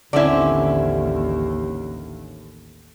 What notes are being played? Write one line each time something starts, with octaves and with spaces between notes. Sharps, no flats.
A1 D#2 D3 C4 C#4 E4 D5